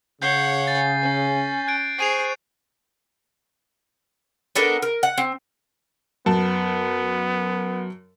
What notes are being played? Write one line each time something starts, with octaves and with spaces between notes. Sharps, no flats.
C#3 C#5 F#5 G6 C7 G7
G#5 A6
C#4
F#6 G#6 D7
G#4 C5 C#6 C7 D#7 F7
B3 D4 A4 A#4
A#4
F#5
C4
F#2 B3 A5